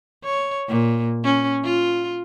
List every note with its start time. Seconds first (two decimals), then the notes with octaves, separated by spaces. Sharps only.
0.24 C#5
0.68 A#2
1.24 C#4
1.64 F4